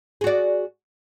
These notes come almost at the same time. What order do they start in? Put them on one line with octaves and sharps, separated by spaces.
G#4 F#4 D5